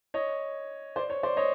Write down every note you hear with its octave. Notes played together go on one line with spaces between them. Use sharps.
C#5 D#5
C5 D5
C#5
C5 D5
C#5 D#5